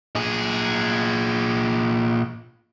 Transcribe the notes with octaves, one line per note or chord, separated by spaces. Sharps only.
A#2 G#4